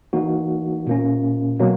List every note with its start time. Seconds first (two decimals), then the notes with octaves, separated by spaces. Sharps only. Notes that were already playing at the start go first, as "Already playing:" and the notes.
0.13 E3 A#3 D#4 F#4
0.87 A#2 A#3 C#4
1.60 B2 F#3 A#3